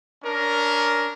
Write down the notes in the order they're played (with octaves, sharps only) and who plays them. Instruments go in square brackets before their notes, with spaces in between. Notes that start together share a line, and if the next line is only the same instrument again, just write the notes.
[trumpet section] C#4 D4 A#4